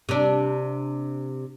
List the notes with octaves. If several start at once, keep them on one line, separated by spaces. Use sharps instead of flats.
C3 D4